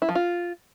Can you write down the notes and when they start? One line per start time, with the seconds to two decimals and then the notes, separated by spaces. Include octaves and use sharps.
0.02 E4
0.09 F3
0.15 F4